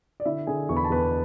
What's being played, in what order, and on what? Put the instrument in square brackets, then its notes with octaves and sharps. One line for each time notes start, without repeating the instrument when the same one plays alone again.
[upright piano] D5
D3 E4 E5
D3 G#4 G#5
E2 C#6
B5
A5
E2 B4 B5